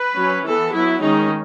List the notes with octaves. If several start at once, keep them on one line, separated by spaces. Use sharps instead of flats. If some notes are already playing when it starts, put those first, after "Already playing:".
Already playing: B4
F#3 C#4
E3 B3 A4
F#3 B3 E4
D#3 G#3 C#4 D#4